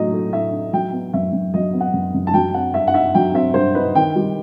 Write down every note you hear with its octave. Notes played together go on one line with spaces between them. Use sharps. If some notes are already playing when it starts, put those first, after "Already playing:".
Already playing: A2 F#3 A3 D#4 D#5
A3
A2 E5
D#4
F#3 G5
B3
F#2 E5
F#2
F#3 D#5
B3
F#5
F#2
F#2
A5
F#3 G5
C4 F#5
G2 E5
F#5
D#4 E5
F#3 G5
C4 E5
G2 C5
D#4 B4
D#3 G5
G3